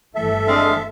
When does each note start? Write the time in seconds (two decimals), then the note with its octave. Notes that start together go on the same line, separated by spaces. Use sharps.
0.15 G1 E3 A3 A4 E5
0.47 G#3 C4 D4 D#5 F5